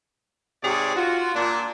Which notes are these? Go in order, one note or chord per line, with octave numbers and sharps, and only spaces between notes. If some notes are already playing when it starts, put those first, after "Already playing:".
G#2 C3 G4 G#4 C#5 D5
F4 F#4
A#2 D4